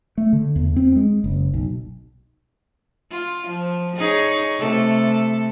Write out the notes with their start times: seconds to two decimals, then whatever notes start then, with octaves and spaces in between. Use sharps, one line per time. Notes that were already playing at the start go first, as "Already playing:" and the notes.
0.18 A3
0.33 D3
0.56 E2
0.76 C4
0.96 G#3
1.24 F#1
1.54 B1
3.11 F4
3.47 F3
3.97 D#4 G#4 C#5
4.59 C3 A3 A4